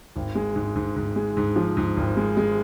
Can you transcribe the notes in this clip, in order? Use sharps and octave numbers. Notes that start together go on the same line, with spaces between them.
G#1
G#3
G#2
G#2
G#2
G#3
G#2
F3
G#2
G#1
G#3
G#3